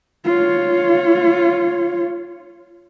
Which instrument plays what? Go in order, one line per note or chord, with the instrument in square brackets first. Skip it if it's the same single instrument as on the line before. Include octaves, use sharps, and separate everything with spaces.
[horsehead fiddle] F4 C#5